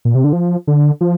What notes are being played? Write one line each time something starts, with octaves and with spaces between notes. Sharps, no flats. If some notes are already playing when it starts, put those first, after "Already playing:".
A#2
C3
D3
F3
D3
F3